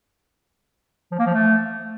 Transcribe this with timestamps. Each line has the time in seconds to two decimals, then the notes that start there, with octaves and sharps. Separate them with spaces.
1.11 F3
1.19 A#3
1.26 F3
1.34 A3